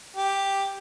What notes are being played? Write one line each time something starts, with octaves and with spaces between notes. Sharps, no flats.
G4